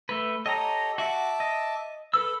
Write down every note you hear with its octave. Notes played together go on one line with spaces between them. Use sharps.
A3 B4
G4 A4 C#5 D#5 A#5
F#4 E5 F#5 A5 D6
D#5
A4 B4 B5 E6